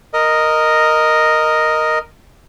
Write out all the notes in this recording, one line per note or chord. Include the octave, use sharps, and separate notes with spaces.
A#4 D#5